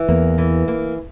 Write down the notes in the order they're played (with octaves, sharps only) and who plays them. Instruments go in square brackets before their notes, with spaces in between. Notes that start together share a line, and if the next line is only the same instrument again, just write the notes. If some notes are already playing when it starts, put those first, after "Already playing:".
Already playing: [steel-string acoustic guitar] E3
[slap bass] E2 [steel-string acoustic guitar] A#3
[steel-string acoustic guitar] E3
A#3